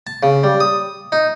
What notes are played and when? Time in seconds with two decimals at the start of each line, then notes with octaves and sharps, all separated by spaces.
0.07 A5
0.23 C#3
0.44 G3
0.60 D#6
1.12 D#4